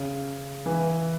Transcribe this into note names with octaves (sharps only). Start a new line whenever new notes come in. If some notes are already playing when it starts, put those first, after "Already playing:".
Already playing: C#3
E3